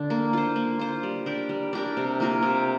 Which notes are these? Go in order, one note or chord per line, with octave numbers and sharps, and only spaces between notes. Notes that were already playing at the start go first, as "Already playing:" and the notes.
Already playing: D3 D4
A#3
F4 C5
A#3
F4 C5
G3
D4 G4 A#4
G3
D4 G4 A#4
C3
A#3 F4 A#4
C3